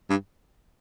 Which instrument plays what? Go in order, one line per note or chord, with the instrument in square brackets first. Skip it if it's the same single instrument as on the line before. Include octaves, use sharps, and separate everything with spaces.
[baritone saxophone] G2